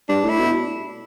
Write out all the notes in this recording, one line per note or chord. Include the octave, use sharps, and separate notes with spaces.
G2 D4
A2
E4
B2